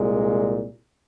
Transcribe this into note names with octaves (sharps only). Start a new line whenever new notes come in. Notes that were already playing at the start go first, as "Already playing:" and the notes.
Already playing: C2 A#2 G#3